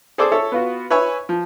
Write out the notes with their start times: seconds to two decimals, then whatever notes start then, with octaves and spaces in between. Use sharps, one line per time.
0.18 G#4 A4 C5 D5 D6 E6
0.32 A4 C#5 E5
0.52 B3 F4 F#4
0.91 B4 C#5 E5 G#5 C#6
1.29 F3